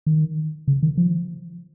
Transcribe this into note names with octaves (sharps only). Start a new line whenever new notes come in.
D#3
C#3
D#3
F3